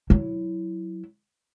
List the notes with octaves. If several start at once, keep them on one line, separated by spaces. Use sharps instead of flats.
F#3 E4